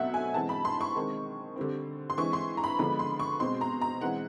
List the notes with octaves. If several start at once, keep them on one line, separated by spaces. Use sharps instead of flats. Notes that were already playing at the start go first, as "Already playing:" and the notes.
Already playing: B2 F#3 A3 C4 E5 F#5
G#5
E3 G#3 C4 A5
B5
C6
C#6
D#3 G#3 C4
D3 G3 C4
C6
E3 G#3 C4 C#6
C6
A#5
B5
D3 F3 G#3 B3 B5
C6
C#6
B2 G#3 C4 C6
A#5
A#5
E3 G#3 C4 F#5